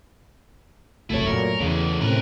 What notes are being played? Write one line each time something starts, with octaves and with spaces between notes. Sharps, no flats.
F1 C2 F#2 A3 E4 A4 C#5
F#2 A#2 A#4
E2 C#3 E3 G#3
A2 C3 C#4 A#4 B4